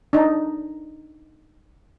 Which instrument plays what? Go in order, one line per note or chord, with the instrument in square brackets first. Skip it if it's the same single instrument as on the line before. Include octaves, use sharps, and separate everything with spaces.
[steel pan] D4 D#4